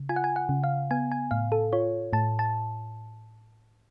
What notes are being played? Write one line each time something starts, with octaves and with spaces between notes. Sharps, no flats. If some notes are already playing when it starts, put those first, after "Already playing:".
Already playing: C#3
F4 G#5
F#5
G#5
F#5
C#3
F5
B3 G#5
G#5
A2 F5
A4
F4 C#5
A2 A5
A5